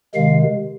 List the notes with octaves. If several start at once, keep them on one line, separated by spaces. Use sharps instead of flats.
C3 D#3 G#3 F5